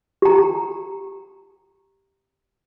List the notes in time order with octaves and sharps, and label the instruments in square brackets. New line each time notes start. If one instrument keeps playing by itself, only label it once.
[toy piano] G4 A#5